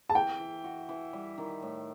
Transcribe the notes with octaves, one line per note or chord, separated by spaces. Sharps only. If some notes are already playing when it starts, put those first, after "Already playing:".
A5
E3 G5
E3
F#4
E3
G3
D#3
A2